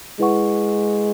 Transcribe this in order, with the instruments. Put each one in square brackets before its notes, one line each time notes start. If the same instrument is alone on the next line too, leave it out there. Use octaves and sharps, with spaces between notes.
[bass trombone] G#3 [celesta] E4 B4 F#5 C#6